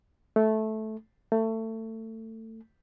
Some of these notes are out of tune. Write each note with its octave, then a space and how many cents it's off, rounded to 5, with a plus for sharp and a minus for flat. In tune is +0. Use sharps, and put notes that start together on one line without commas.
A3 -10
A3 +25